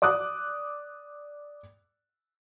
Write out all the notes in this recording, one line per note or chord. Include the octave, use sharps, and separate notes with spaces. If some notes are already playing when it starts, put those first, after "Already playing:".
D5 D6 D#6 F#6